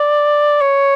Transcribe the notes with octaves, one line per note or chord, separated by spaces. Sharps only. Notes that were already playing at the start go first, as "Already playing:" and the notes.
Already playing: D5
C#5